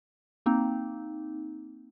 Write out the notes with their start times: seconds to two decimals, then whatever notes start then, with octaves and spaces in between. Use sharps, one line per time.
0.46 A#3 C4 D#4